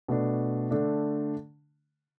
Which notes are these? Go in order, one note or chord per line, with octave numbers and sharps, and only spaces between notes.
B2 A3 D4
D3 A3 D4